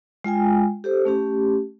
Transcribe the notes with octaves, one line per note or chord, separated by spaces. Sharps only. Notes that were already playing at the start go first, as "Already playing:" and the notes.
G#3 F4 G5 G#5
G4 A4 C5
A3 C#4 G4